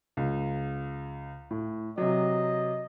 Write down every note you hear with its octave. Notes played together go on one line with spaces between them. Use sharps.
C#2
A2
C3 F#3 D#5